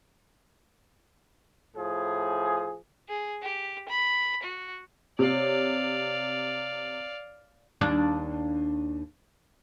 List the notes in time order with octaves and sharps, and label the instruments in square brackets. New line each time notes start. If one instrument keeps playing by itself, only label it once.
[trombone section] A2 F3 G#4
[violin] G#4
G4
B5
F#4
[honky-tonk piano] C3 [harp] C#5 [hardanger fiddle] D5 F5
[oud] D#2 D4